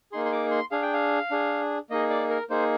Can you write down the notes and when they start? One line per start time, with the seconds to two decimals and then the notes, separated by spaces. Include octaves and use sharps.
0.12 A#3 D#4 G#4 C6
0.25 C6
0.32 D6
0.51 C6
0.71 D4 G#4 F5
0.82 G5
0.93 F5
1.31 D4 G#4
1.90 A#3 D#4 G#4 D#5
2.10 D5
2.30 A#4
2.50 A#3 D#4 G#4 C5